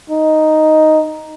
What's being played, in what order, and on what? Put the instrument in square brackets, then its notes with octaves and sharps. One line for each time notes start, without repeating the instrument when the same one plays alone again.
[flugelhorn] D#4